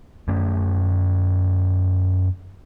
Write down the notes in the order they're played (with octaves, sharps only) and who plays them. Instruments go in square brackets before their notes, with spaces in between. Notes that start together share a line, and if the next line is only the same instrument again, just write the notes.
[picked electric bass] F#2 A3 C#4